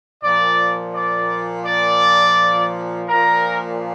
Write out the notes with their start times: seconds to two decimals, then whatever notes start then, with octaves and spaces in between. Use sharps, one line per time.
0.23 A#2 F3 D5
0.94 D5
1.66 D5
3.09 A#2 F3 A#4